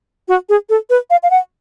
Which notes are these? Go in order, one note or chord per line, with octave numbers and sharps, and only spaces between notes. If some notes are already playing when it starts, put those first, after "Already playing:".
F#4
G#4
A4
B4
F5
F5
F#5